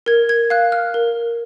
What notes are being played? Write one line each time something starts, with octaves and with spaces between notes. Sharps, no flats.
A#4 G#6
G#6
F5 F#6
F6
A#4